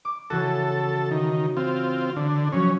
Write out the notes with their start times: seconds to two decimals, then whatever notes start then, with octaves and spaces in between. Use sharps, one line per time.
0.05 D6
0.30 C#3 E3 F#4 A4
1.11 D#3
1.57 C4 F4
2.16 D3
2.52 F3 F#3 C#4